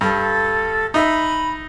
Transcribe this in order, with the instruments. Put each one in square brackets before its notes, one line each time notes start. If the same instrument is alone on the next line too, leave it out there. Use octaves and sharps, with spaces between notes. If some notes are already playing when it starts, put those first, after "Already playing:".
[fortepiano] G2 [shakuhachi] A4
[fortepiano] D#4 E5 [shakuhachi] B5